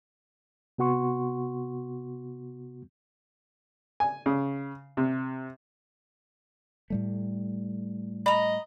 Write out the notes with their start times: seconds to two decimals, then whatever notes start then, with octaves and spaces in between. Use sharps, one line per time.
0.78 C3 B3 F#4 F#5 C6 C#6
4.00 G#5
4.26 C#3
4.97 C3
6.90 A2 G3 A3
8.26 D#5 A#5 B5